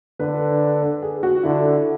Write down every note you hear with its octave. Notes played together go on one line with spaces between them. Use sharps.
D3 B4
B4
G#4
F#4
D3 E4